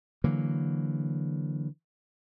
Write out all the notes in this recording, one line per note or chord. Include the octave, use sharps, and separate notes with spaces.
D3 E3 F#3 A#3